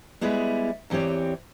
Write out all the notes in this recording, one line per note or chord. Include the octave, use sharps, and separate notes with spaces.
G3 G#3 B3 E4 G#4
E2 E3 C4 G4 C#5